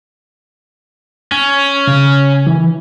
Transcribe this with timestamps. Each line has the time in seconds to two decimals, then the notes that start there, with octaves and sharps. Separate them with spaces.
1.32 C#4
1.87 C#3
2.47 E3